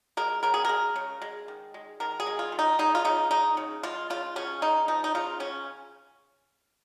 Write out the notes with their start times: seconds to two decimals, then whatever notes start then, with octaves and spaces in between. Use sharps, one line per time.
0.17 G#3 A#4
0.43 C#3 A#4
0.54 G#4
0.65 G#3 A#4
0.96 C#3
1.22 G#3
1.48 D#3
1.74 G#3
2.00 D#3 A#4
2.20 G#4
2.27 G#3
2.39 F4
2.52 D#3
2.59 D#4
2.79 G#3 D#4
2.95 F4
3.05 C#3 D#4
3.31 G#3 D#4
3.57 C#3
3.83 G#3 F4
4.10 C#3 F4
4.36 C#3 C#4
4.62 G#3 D#4
4.88 F3 D#4
5.04 D#4
5.15 C#3 F4
5.40 C#3 C#4